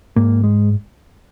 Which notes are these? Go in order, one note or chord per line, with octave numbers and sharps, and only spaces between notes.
G#2 A#3
G#3